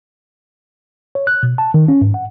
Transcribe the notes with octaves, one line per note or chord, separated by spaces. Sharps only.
C#5
F#6
B2
A5
D#3
C#4
G#2
F#5